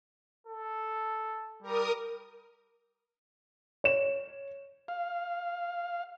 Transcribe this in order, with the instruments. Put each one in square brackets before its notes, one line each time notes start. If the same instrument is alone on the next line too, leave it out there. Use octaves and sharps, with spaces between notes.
[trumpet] A4
[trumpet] G3 [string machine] A#4 D#6
[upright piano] C#5 E7
[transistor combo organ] F5